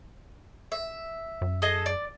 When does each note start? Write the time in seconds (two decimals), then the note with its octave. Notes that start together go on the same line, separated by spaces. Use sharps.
0.72 E5
1.42 F#2
1.62 G#4 A4 D#5
1.86 D5